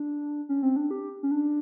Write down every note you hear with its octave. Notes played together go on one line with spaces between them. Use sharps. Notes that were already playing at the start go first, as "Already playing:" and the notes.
Already playing: D4
C#4
C4
D4
G4
C#4
D4